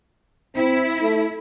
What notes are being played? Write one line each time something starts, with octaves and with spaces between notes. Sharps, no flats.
C4 E4
A3